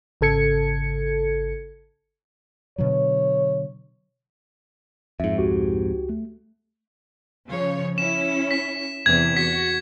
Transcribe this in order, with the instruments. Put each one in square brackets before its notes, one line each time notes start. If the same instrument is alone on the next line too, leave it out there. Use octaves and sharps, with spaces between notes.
[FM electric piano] G#1 C#3 A4 G#6 C#7
[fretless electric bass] B2 D3 F#3 [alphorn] C#5
[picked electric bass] F2 G#2 [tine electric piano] E5
[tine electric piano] C#2 F#4 G4
A3
[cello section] C#3 F3 C#5
[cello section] C#4 E4 [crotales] E7
[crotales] B6
[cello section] E2 C3 E3 [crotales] G#6
[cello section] F#4 [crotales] B6